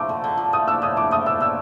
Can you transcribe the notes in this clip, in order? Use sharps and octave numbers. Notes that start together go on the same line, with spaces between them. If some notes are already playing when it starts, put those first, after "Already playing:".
Already playing: F3 A3 A#5 D6
D3
D3
F3
A3 D#6
D4 E6
A2 D#6
F3 D6
A3 D#6
D4 E6
A2 E6